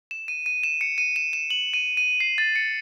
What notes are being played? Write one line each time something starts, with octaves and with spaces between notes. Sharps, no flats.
E7
D#7
D#7
E7
C#7
D#7
E7
E7
F#7
D#7
D#7
C7
A6
C#7